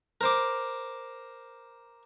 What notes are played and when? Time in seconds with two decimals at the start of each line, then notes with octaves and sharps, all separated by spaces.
0.21 A#4 C5 D6